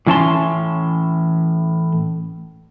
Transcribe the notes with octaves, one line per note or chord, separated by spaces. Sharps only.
A2 E3 C#4 D5 A5 C6